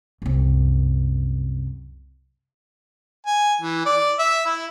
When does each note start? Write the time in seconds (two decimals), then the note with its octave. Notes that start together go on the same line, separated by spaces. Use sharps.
0.22 C2 F#2
3.27 G#5
3.62 E3
3.86 D5
4.19 E5
4.46 E4